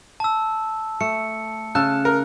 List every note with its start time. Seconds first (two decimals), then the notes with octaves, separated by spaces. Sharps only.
0.20 A5 E6
1.01 A3 C#7
1.75 C#3 A5 E6 F#6
2.05 A#4